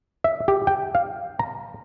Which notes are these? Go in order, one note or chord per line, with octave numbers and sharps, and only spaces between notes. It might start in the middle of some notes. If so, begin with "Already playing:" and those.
E5
G4
G5
F5
A#5